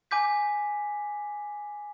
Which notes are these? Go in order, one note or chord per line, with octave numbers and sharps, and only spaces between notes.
G#5 D6 G6 B6